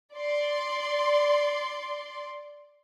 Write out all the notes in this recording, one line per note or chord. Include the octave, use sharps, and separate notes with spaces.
D5 C6